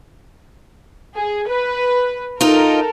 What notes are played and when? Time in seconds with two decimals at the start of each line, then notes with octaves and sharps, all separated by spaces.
1.16 G#4
1.48 B4
2.41 D#4 F4 A4 A#4